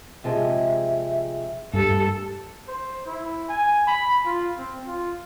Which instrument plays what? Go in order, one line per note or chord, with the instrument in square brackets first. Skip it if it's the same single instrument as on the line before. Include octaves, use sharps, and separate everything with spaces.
[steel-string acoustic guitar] C3 F3 G#3 [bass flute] E5
[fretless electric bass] G2 [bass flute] G4 [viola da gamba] A4
[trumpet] C5
E4
G#5
B5
F4
C4
F4